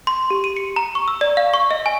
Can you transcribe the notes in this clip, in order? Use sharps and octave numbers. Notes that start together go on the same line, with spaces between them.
C6
G4
D#7
C#7
A#5
C#6
E6
D5
F5
C#6
D#5
G#5